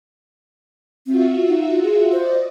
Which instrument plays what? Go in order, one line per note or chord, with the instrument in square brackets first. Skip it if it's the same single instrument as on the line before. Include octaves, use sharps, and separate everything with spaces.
[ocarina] C4 [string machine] F4 F#4 E5
[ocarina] D#4
G#4
[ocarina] C5 [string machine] D5 D#5